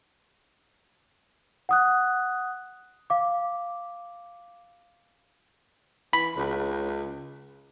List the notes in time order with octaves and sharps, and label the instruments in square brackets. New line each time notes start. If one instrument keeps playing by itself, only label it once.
[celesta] F#5 D#6 F#6
F5 D6
[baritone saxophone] E3 [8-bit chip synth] B5
[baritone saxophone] C#2